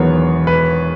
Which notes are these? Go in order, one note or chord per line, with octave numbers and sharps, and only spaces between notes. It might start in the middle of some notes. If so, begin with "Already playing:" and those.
Already playing: E1 E2 D#3 F#3 B3 C#5
B4